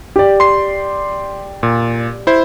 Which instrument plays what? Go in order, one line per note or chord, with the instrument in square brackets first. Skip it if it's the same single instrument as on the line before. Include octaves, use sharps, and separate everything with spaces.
[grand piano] G4 D5
[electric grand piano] C6 C7
A#2
E4 C5